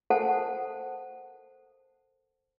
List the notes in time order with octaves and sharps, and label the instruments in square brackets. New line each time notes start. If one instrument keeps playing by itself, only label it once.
[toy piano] A4 A#4 C5 F#5 G#5 A5